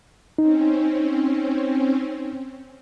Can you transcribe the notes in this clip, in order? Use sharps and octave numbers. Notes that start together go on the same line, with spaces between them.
C4 C#4 D#4